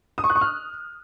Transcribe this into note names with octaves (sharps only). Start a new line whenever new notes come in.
D#6
C#6
F#6
C#6
F6